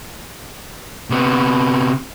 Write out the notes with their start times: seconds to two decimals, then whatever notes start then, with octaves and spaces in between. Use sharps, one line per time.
1.10 C3 B3